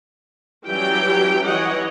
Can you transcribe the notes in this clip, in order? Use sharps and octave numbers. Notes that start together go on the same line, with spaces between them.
E3 F#3 G3 C#4 G4 G5
E3 C#5 D#5 F#5